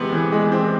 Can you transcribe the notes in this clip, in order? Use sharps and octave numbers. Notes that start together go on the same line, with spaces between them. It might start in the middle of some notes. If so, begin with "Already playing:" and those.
Already playing: C3 E3 G#3 B3 C4
E3
G#3
C4